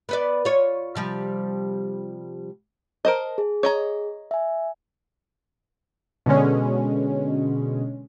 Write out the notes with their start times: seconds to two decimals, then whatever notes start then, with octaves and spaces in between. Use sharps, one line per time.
0.09 B3 B4 D5
0.45 F4 C#5
0.95 C3 F3 G3
3.05 A#4 C5 D#5 A5
3.38 G#4
3.63 C#5 D#5 A#5
4.31 E5 G#5
6.26 B2 D3 G#3 C#4